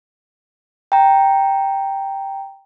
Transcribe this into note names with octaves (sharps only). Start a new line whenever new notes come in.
G5 A#5